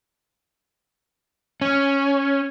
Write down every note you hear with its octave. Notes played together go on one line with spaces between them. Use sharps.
C#4